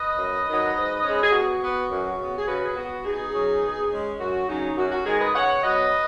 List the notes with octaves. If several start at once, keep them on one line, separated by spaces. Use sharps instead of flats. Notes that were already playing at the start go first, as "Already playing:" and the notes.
Already playing: B4 D#5
F#2
D#3 F#3
G#2
G#3 C#4
G#4
B2 F#4
B3
F#2
C#3 B3
G#4
C#3 F#4 B4
G#4
B3 F#4
B2 D#4 G#4
F#3 C#4
B2
G#3 C#4
F#2 F#4
C#3 F#3 C#4 D#4
F#2 F#4
F#4
D#3 G#3 D#4 G#4
B4 D#5
C#3 C#5 F#5
F#3 B3 B4 D#5